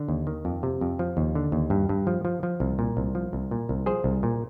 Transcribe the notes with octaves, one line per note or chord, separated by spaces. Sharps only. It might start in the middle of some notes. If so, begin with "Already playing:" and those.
Already playing: D3
D#2
D#3
F2
C3
F2
F3
D#2
D3
D#2
G2
G2
F3
F3
F3
C2
A#2
C2
F3
C2
A#2
C2
F3 G#4 C5
C2
A#2